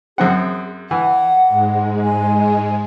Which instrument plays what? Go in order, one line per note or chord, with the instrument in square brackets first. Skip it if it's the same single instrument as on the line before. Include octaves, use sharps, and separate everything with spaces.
[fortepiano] F#2 C4 F#5 [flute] G#4
[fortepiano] E3 [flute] F#5
[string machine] G#2 G#3
[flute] G#5